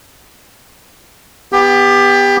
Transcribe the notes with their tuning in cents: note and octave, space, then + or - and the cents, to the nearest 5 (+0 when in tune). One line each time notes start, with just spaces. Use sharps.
B3 +0 G4 +25